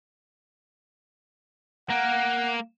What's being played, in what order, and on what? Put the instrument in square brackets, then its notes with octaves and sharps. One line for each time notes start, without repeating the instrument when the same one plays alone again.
[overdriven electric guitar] A#3 [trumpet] F#5